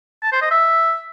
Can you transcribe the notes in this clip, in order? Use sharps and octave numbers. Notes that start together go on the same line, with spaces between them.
A5
C5
D#5
E5